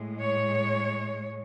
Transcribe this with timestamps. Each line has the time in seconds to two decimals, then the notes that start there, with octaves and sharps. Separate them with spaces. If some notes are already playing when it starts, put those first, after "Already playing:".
Already playing: A2 G#3
0.20 C#5